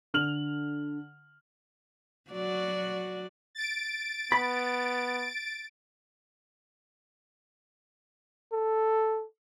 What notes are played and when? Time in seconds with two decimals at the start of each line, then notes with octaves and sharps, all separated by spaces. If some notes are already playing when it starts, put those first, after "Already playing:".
0.14 D3 F6 F7 F#7
2.31 F#3 F#4 D5
3.55 A6 D7
4.32 B3 B5
8.52 A4